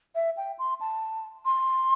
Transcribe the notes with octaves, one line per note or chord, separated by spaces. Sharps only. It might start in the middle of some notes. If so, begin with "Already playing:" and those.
E5
G5
C6
A5
C6